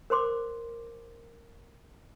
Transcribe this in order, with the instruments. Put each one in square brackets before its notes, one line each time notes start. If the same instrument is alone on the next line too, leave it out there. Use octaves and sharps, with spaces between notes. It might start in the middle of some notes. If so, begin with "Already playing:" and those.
[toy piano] A#4 C5 C6 D6